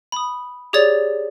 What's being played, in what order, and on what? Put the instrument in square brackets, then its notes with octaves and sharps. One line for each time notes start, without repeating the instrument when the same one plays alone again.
[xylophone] B5 D#6
G4 G#4 C#5 D5 A6